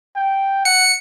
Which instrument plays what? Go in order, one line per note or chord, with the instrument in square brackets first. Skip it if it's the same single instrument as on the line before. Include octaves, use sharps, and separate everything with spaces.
[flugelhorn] G5
[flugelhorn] F#5 [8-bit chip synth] C#7